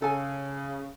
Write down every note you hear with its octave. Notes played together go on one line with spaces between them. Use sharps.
C#3 A4 G#5